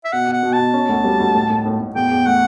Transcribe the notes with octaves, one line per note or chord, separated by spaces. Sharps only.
E5
B2 F#5
B2
F#5
B2
A5
B2
C#4
D2
G3
D2
A2
A2
A2
A2
E2 G5
E2
A3 F#5